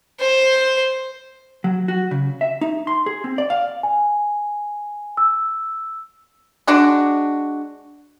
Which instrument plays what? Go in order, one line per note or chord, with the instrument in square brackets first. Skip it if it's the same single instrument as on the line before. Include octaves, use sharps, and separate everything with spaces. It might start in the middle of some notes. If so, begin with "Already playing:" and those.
[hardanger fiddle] C5
[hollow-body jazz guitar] F#3
F#4
C#3
E5
D#4
C6
G#4
C4
D5
F5
[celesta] G#5
E6
[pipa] G#3 D4 F#4